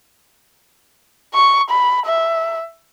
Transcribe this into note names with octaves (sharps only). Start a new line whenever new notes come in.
C#6
B5
E5